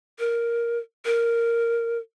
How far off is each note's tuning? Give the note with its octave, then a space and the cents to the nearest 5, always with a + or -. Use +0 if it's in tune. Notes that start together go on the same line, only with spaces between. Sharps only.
A#4 +5
A#4 -5